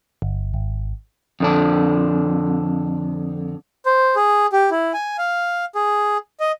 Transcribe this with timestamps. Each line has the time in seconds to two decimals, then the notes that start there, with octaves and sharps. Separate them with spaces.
0.22 G1
0.54 G#1
1.40 F2 D3 D4
3.86 C5
4.16 G#4
4.52 G4
4.71 E4
4.94 G#5
5.18 F5
5.75 G#4
6.40 D#5